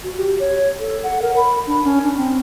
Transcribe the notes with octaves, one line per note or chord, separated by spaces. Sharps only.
F#4
G4
C#5
A4
F#5
A#4
B5
D4
C#4
D4
C4